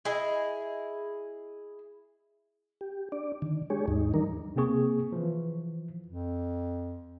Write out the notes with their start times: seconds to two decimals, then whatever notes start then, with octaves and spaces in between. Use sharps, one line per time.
0.05 E4 G#4 D#5
2.81 G4
3.12 D4 D5
3.42 D3 D#3
3.70 G#3 D4 G4 G#4 C#5
3.88 D#2 G#2 D#4
4.14 D#3 E3 G3 D4 D#4 A#4
4.56 C3 A#3 C4 G#4 C#6
5.12 E3 F3
6.06 F2